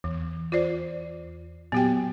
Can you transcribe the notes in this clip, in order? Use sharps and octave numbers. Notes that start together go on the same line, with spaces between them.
E2 E3
F4 C5 D5
A#2 F#3 B3 G4 G5